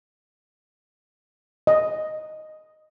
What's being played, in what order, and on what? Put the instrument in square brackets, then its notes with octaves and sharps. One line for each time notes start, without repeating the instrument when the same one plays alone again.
[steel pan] D#5